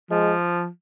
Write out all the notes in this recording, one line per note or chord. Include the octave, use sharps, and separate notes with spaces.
F3 G#3